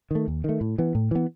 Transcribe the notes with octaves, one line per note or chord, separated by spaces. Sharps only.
D#3 A3
D#2
D#3 A3
A2
E3 B3
A2
E3 B3